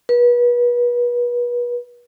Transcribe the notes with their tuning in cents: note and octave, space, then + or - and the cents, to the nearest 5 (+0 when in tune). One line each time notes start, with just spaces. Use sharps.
B4 -35